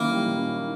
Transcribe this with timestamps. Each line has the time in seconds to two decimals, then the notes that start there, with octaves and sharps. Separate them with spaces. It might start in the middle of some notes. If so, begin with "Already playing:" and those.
Already playing: D#3 A#3 C#4 E4
0.09 G3
0.24 A#2
0.38 C#4
0.53 E4